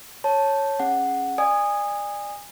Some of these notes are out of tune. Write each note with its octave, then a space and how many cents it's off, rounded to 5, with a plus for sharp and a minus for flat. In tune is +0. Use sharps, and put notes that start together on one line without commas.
C#5 -5 A5 +0
C#4 -20 G#4 +15 F#5 +0
D5 +20 G#5 -25 D#6 -15